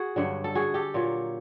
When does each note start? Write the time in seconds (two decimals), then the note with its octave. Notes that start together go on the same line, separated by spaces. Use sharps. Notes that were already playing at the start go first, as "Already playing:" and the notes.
Already playing: F#4 G#4
0.16 G2 D3 F#3
0.44 A4
0.55 F#4 G#4
0.74 G4 A4
0.94 A#2 F#3 A#3